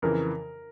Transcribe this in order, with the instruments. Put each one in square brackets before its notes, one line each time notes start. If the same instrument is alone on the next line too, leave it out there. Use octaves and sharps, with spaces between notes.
[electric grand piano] F2 C#3 E3 [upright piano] A#4